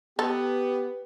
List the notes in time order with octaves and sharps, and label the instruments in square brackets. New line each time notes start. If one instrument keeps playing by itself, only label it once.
[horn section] B3 [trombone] G4 [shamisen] A4 [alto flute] B4